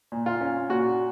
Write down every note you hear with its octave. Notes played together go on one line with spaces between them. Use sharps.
A#2
F4
C#4
A#2 F#4